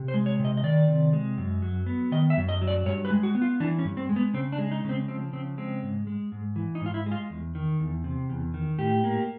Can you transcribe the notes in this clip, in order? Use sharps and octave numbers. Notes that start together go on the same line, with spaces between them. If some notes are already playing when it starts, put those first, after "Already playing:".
Already playing: C3
C5
G#3
C#5
C3
D#5
D#5
D#3 D5
C3
G#3
F#2
F#3
B3
D#3 D#5
E5
F#2
D#5
F#3
D5
G2 C#5
B4
G#3
F#4
B3
F4
E3 D4
C#4
G2
C4
G#3
B3
C#3 C4
D4
G#3
D#4
C#3 C4
F3 C4
C#3 C4
G#3 C4
G#2
G#3
G#2
E3
D#4
G#2 F4
E4
G#3
F4
E2
D#3
E2
C3
E2
D#3
A2 G4
A#3